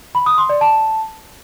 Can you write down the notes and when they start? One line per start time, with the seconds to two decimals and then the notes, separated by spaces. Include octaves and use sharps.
0.15 B5
0.26 D#6
0.38 C6
0.49 D5
0.61 A5